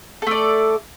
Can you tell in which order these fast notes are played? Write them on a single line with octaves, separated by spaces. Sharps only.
A4 A3 D5